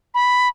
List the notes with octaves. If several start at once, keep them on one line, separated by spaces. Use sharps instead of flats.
B5